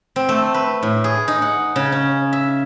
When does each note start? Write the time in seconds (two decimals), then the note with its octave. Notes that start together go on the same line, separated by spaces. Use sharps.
0.16 C4
0.29 A3
0.54 B4
0.83 A2
1.04 G#4
1.28 D#4
1.42 F#5
1.76 C#3
1.92 C#4
2.33 E5